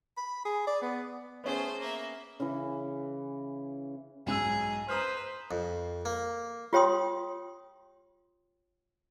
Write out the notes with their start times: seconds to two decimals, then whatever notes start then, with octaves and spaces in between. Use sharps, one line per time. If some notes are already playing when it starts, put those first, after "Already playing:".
0.17 B5
0.45 G#4
0.67 D5
0.82 B3
1.44 A3 B3 C#4 G#4 C5
1.79 A#3 E5
2.40 C#3 E3
4.26 B1 G#2 G#4 E6
4.88 B4 C5 A#5 D#6 F6
5.51 F2
6.05 A#3
6.73 F4 G4 C#5 G5 C6 D#6